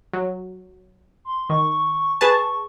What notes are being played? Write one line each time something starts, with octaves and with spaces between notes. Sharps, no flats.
F#3
C6
D#3 C#6
G#4 B4 A5 C#6